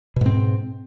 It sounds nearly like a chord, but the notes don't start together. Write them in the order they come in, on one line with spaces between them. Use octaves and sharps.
B2 G#2 C4